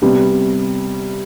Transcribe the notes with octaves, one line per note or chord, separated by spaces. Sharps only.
C3 G3 B3